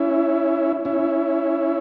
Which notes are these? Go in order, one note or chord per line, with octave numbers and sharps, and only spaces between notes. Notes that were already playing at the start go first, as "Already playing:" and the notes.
Already playing: C#4 E4
C#4 E4